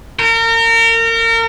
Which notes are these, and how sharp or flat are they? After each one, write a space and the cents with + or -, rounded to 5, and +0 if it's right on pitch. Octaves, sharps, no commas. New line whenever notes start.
A#4 -30